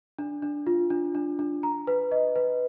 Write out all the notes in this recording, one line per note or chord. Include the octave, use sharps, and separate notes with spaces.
D4
D4
F4
D4
D4
D4
A#5
B4
D#5
B4